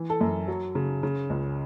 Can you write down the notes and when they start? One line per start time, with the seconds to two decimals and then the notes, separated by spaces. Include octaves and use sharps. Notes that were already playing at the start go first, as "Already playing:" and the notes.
Already playing: E3
0.10 A4
0.21 F#2
0.48 F#3
0.75 C#3
1.03 C#3
1.30 C#2